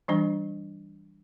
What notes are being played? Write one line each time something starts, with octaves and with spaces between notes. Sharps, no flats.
E3 G3 D4